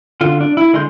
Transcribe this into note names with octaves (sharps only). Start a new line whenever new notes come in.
D3 F4
D4
E4
D3 G#3 D#5 C6 G6